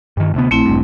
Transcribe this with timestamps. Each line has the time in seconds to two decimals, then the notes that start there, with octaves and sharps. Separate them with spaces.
0.17 G2 D#3
0.34 D2 C3 B3
0.51 A#1 A3 C4 E4
0.66 E1 G2